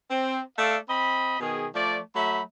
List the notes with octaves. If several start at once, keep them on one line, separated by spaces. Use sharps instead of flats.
C4
A3 A4 D5 F5
C4 D#5 B5
B2 D#3 G#4
F3 A3 D5
F#3 A3 E5 B5